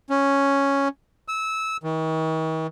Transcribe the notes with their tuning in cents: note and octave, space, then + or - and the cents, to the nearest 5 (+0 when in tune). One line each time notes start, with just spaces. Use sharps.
C#4 +0
E6 -20
D#3 +45